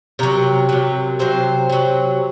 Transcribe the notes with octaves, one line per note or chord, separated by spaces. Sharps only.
C3 F#3 A#4
C3 F#3
C3 F#3 C5
C3 F#3